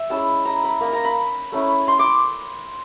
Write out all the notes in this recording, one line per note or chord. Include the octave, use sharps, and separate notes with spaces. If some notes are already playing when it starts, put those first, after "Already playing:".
Already playing: E5
G#3 C#4 E4 A5
A#5
B5
A#3 D#4 A#5
A#5
B5
A3 C#4 E4
C6
D6